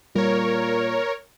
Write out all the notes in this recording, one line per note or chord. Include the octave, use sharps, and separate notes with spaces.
A#2 G3 A#4 C#5